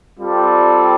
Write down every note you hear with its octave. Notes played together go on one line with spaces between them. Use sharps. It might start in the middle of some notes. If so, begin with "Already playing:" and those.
G3 C4 F4 A4 D5